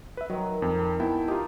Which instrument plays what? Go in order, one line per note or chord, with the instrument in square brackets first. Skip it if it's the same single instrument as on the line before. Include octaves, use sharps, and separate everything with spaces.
[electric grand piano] B4 E5
[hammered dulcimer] D#3 [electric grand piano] F#3
[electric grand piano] F2
[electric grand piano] B3 E4 G5 [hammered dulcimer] A5
[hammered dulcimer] D#4 [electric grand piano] F4 G4